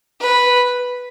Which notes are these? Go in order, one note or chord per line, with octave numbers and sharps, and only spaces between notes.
B4